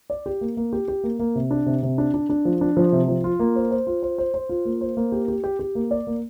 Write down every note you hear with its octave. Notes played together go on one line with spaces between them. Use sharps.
D5
G4
A#3
A#3
G4
G4
A#3
A#3
C3
D4
C3
C3
D4
D4
D4
F3
D4
F3
C3
F3
F4
A#3
C5
C5
F4
C5
C5
C5
F4
A#3
C5
A#3
G4
G4
G4
G4
A#3
D5
A#3